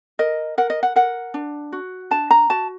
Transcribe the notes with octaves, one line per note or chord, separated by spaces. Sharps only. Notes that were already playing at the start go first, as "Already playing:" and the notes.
A#4 D#5
A#4 F#5
D#5
F#5
A#4 F#5
D4
F#4
D4 A5
A#5
F#4 A5